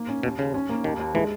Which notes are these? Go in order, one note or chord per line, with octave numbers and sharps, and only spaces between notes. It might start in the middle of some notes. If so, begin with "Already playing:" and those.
Already playing: A#3
C#4
D#2 B2
D#2 C#3
C#4
A#3
D#2 D#3
D#2
E3 G#3